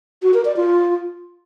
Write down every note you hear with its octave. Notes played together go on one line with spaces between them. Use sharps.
F#4
A#4
D5
F4